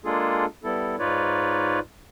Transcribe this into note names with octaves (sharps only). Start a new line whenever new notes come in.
G#3 A#3 D4 F4 G#4 A4
G3 B3 E4 A4
G#2 D#4 F4 B4 C#5 D5